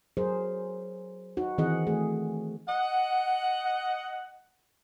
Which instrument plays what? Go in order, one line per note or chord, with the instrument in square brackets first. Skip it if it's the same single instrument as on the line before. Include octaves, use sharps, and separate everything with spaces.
[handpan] F#3 G#4 A#4 C5
D#4 F#4
D#3 E3 C4 G#4 D#5 F#5
A3 G#4
[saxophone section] D#5 F#5